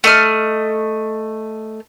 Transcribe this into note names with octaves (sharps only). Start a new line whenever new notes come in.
A3 D#5 F6